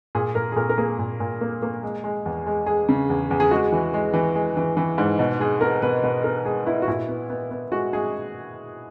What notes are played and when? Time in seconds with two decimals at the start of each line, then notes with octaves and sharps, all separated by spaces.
0.15 A#2 G#4
0.35 A#2 A#4
0.52 G#4
0.56 A#2 A#4
0.69 A#4
0.78 A#3 G#4
0.99 A#2
1.20 A#2
1.41 A#3
1.62 A#3
1.83 G#3
2.04 G#3
2.26 E2
2.47 G#3
2.66 G#3 G#4
2.89 C#3
3.10 E2
3.31 E2
3.40 G#4
3.51 G#3 F#4
3.72 E3
3.94 G#3
4.14 E3
4.36 G#3
4.57 E3
4.77 E3
4.98 G#2
5.19 B2
5.40 G#3 G#4
5.61 B3 A#4
5.82 B2 B4
6.03 B2 B4
6.24 B3 A#4
6.45 G#3 G#4
6.66 B3 E4
6.82 F#4
6.88 A#2 E4
7.08 B3
7.30 B3
7.51 B3
7.72 G#3 F#4
7.93 G#3 G#4